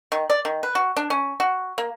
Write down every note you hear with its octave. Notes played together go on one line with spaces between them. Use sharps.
D#3
D5
D#3
B4
F#4
D4
C#4
F#4
A#3